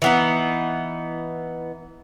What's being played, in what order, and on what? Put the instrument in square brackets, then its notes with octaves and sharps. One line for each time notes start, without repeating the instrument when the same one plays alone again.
[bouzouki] E3 B3 D#4